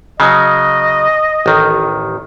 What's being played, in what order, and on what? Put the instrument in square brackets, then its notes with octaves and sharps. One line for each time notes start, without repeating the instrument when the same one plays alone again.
[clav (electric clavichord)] C#3 F#3 [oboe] D#5
[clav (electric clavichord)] A1 D#3